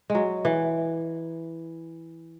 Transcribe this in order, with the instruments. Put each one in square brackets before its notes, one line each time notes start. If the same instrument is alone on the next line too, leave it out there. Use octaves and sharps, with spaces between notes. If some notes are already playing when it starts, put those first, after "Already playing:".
[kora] G#3
F#3
E3